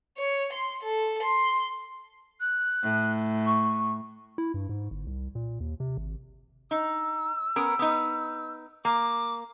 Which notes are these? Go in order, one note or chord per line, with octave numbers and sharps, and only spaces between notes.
C#5
C6
A4
C6
F#6
A2
C#6
E4
G2
G#2
G1
C2
A#2
D#2
C3
G#1
D#4 E6
B3 C#4 A#4
B3 D#4
A#3 D6